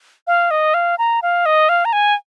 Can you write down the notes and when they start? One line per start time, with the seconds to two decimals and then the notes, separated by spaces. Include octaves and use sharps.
0.27 F5
0.51 D#5
0.74 F5
0.98 A#5
1.22 F5
1.46 D#5
1.69 F5
1.85 A#5
1.93 G#5